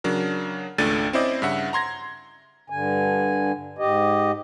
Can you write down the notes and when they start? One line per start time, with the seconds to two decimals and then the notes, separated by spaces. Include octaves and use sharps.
0.04 C#3 F#3 D4 A#4
0.78 G#1 C#2 A3 D4 A6 D#7
1.13 C4 C#4 E4 C5 D5 D#5
1.42 G2 C#3 E5 F#5
1.73 A#5 C6 G#6 A#6
2.70 G2 D3 G#5
3.78 G#2 G4 D#5